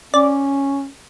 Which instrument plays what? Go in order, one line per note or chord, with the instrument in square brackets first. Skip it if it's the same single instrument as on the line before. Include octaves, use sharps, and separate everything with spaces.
[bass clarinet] C#4 [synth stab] D5